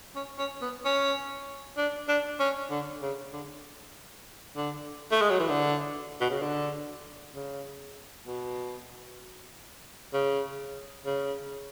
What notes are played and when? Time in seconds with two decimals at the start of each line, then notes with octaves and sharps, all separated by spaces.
0.16 C#4
0.38 C#4
0.62 B3
0.85 C#4
1.78 D4
2.09 D4
2.40 C#4
2.70 D3
3.02 C#3
3.33 D3
4.56 D3
5.11 A3
5.21 G#3
5.30 F#3
5.40 E3
5.49 D3
6.21 B2
6.31 C#3
6.42 D3
7.35 C#3
8.27 B2
10.13 C#3
11.06 C#3